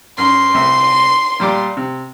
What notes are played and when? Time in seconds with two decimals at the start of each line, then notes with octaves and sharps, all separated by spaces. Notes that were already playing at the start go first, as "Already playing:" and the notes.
0.18 F#2 C6
0.54 C2 E5
1.40 A#2 G3 D6
1.77 C3